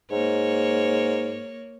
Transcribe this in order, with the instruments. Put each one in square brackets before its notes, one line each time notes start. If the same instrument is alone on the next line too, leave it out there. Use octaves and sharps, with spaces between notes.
[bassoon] G#2 [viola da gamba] A#3 C#5